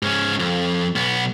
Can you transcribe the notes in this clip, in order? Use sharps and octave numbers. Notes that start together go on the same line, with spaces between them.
G#2 C#4
F2
B1 B3